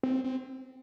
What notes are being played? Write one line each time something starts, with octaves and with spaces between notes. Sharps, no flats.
C4
C4